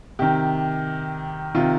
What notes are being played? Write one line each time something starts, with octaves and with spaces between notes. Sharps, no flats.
C3 D#3 G4
C3 D#3 F4